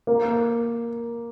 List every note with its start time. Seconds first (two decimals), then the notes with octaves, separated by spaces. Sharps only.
0.07 A#3